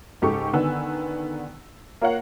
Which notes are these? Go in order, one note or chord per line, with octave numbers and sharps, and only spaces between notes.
C#2 G#2 G4 A4 C#6
D3 D#3 B3 F#5 G#5 E6
A#3 F4 A#4 C#5 F5 F#5